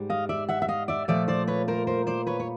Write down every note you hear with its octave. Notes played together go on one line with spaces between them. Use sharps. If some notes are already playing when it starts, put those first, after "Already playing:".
Already playing: G#2 G3
D#5 F5
D5 E5
E5 F#5
E5
D#5 F5
D5 E5
A#2 F3 A3 D5 E5
C5 D5
B4 C#5
A#4 C5
A#4 C5
C5 D5
B4 C#5
C#5